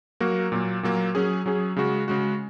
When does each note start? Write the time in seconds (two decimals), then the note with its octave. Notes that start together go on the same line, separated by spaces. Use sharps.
0.20 F#3 A#3 F#4 A#4
0.52 A#2 F#3 A#3
0.83 A#2 F#3 A#3
1.15 F#3 C#4 G#4
1.46 F#3 C#4 G#4
1.76 C#3 G#3 F#4
2.08 C#3 G#3 F#4